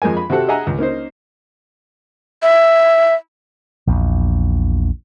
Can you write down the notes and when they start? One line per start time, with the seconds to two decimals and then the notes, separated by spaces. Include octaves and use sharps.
0.02 F2 G#3 A#4 G#5
0.17 B5
0.30 C3 F#4 G4 A4 F#5
0.48 G#4 D#5 E5 F#5 G#5 A#5
0.67 C#2
0.78 A#3 C#4 D#4 C5
2.42 E5
3.87 A#1 E2